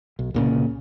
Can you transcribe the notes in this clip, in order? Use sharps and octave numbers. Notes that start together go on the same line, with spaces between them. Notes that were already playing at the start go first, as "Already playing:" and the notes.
B1
C2 A#2 C#3